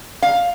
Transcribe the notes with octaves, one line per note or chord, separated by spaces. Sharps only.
F5